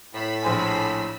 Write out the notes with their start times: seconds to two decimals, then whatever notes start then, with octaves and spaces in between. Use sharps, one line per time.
0.14 A2 B5 E6 B6
0.43 A#1 C5 G#5